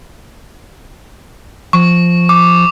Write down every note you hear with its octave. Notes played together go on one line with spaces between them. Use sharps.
F3 C#6
D6